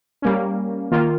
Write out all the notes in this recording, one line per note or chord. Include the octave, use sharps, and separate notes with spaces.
G3 A#3 C#4
D#3 A#3 F4